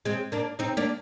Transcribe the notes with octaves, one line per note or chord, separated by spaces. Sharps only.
G#3 C4
A#3 D4
C4 D#4
A#3 D4